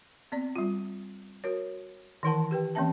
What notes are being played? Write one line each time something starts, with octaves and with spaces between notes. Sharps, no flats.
B3 C4 D5
G3 F4
F#4 A#4 C#5
D#3 E3 E4 A#4 F#5 A5
G4 B4 G5
E3 A#3 C4 C#4 E5 A5